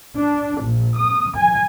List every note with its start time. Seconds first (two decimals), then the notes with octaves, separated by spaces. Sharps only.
0.16 D4
0.64 A#1
0.97 D#6
1.37 G#5